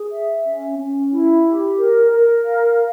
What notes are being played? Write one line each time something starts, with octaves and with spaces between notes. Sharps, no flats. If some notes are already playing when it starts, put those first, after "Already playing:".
Already playing: G#4
E5
C#4
C#4
E4
G4
A#4
A#4
F5